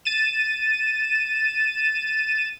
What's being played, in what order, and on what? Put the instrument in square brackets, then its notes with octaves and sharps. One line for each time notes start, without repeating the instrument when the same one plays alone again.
[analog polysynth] A6 D#7 E7